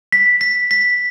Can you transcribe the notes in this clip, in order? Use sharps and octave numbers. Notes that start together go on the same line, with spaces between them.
B6
B6
B6